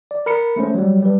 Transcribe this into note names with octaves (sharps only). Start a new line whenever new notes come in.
D5
A#4 B5 C#7
G#3 A3 C#4 C5
F#3 G3
G3 B4